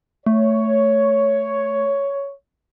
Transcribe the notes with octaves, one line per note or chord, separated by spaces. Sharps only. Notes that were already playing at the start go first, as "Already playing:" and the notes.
A3 C#5